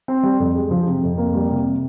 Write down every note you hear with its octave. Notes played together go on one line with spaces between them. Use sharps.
C4
G3
F2
G#3
F3
C3
F2
A#3
G3
C3